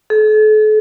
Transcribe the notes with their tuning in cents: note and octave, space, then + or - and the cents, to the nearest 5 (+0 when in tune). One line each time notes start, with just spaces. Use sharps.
A4 -40